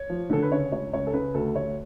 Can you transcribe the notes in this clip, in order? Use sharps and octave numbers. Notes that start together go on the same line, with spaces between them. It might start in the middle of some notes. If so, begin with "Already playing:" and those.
Already playing: C#5
F3
D3 A4
B4
C#3 C#5
C#2 C#5
C#2 C#5
A4
C#3 B4
D2 A4
D2 C#5